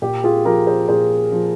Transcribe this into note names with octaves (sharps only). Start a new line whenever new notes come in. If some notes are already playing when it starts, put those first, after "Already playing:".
A#2 G4
F4 G#4
F3 G4 A#4
G#4 C5
A#2 G#4 C5
F3